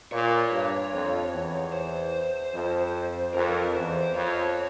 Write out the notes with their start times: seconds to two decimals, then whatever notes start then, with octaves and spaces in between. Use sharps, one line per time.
0.11 A#2 C#5
0.52 G2
0.92 F2
1.33 E2
1.72 C5
2.54 F2
3.34 F2 A#4
3.42 C5
3.49 A#4
3.75 E2 C5
4.15 F2 C#5